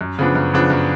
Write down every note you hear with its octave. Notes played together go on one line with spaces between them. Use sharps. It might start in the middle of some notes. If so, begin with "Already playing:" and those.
F#2
C#3 F3 B3 D4
F#2
C#3 F3 B3 D4
F#2